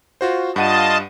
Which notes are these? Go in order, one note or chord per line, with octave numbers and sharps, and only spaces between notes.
F4 F#4 C5
G2 F4 D#5 F#5 A5 D#7